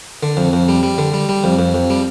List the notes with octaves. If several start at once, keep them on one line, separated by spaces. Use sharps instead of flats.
D3
F2
F2
G3
G3
D3
G3
G3
F2
F2
F2
G3